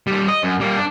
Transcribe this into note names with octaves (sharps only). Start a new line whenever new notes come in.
D#2 G3
D#5
F#2
G3 A#3
D4